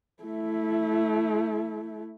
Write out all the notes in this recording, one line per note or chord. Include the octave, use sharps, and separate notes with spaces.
A3 E4